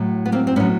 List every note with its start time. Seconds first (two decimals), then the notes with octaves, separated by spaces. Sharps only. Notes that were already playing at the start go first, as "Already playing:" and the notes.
Already playing: A2 F#3
0.26 B3
0.32 A#3 C4
0.47 C4
0.56 A2 F#3 B3 C#4